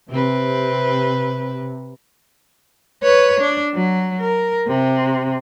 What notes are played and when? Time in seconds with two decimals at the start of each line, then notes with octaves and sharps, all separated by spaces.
0.10 C3 C4 B4
3.03 B4 C#5
3.40 D4
3.74 F#3
4.20 A#4
4.67 C3